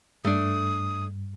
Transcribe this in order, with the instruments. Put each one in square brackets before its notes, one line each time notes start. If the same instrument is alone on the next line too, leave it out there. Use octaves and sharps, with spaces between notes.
[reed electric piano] G2 [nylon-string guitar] A3 D4 [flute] D#6